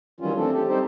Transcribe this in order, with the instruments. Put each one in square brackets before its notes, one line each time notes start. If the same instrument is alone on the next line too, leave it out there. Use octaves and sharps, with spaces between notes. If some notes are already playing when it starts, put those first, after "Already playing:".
[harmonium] D#3 E3 F#3 G3 C#4 F4
A3 C4 D4 A4
G4 A4
G3 C4 D#4 G4 A4 C5